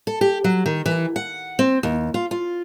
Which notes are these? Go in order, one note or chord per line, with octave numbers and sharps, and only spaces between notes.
A4
G4
F#3
D#3
E3
F#5
C4
D#2
F4
F4